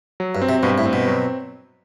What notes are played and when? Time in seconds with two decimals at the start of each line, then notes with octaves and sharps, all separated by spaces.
0.20 F#3
0.35 G2
0.42 C4
0.49 C3
0.63 G2 B2
0.78 A2
0.85 C4
0.93 B2
1.07 F#3